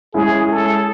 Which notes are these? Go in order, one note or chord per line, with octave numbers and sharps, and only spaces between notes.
G#3 C#4 E4 G#4
A4